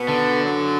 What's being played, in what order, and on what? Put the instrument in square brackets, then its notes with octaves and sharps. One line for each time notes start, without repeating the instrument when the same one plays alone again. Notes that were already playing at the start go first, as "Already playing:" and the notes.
Already playing: [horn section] B2 B3
[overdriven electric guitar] D3
[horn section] F#2 F#3